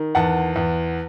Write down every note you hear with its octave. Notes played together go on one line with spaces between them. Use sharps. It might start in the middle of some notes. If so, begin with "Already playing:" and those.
Already playing: D#3
E2 F#5 A5
E2